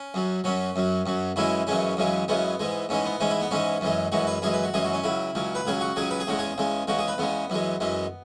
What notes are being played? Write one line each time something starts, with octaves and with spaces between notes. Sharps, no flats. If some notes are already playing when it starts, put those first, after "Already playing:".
Already playing: C#4
F#2 F#3
F#2 F#3 C#4
F#2 F#3
F#2 F#3
F#2 C#3 E3 G#3 E4
F#2 C#3 E3 G#3 C#4
F#2 C#3 E3 G#3
F#2 C#3 E3 G#3 B3
G#2 E3 G#3
G#2 E3 G#3 C#4
B3
G#2 E3 G#3 C#4
E4
B3
G#2 E3 G#3 C#4
F#2 E3 G#3
F#2 E3 G#3 F#4
B4
F#2 E3 G#3 G#4
B4
F#4
F#2 E3 G#3 G#4
F#4
C#4
C#2 C#3 F#3 E4
C#2 C#3 F#3
B4
C#2 C#3 F#3 G#4
F#4
C#2 C#3 F#3 G#4
B4
G#4
E2 C#3 G#3 F#4
G#4
E2 C#3 G#3
E2 C#3 G#3 F#4
G#4
B4
E2 C#3 G#3 B3
F#2 E3 G#3
F#2 E3 G#3